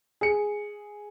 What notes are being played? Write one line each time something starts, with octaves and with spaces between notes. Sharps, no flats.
G#4 C#7